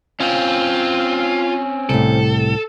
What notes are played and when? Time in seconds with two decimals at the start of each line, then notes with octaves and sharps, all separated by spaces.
0.20 C4 C#4 F4
1.89 C2 A2 A4